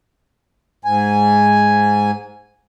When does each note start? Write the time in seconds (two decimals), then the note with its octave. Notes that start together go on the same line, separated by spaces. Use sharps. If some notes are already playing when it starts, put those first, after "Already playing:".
0.85 G#2 G#5